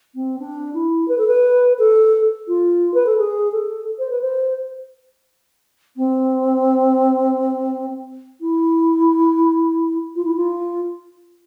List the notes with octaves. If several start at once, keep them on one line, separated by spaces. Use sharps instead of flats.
C4
D4
E4
B4
A4
B4
A4
F4
B4
A4
G#4
A4
C5
B4
C5
C4
E4
F4
E4
F4